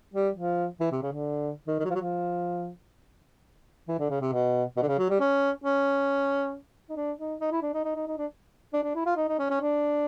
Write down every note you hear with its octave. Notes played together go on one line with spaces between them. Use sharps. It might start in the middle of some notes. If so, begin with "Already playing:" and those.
G3
F3
E3
C3
C#3
D3
D#3
D#3
F#3
F3
F#3
F3
E3
D3
C#3
C3
B2
B2
D3
C#3
F#3
G3
C#4
C#4
D#4
D4
D#4
D#4
E4
D4
D#4
D#4
D#4
D#4
D4
D4
D4
E4
F4
D#4
D#4
C#4
C#4
D4